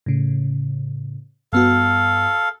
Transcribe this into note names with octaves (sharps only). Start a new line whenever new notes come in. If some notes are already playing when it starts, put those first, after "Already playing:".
A2 C#3
G2 B3 F#4 A4 F5